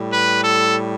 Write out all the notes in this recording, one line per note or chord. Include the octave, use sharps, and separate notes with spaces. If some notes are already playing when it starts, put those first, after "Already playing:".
Already playing: A2 G3
B4
A4